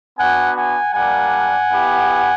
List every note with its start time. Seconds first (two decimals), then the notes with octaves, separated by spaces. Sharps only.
0.18 B3 D4 F#4 F#5 G#5
0.56 F#5 G#5
0.94 G3 A#3 D4 F#5 G#5
1.70 B3 E4 G4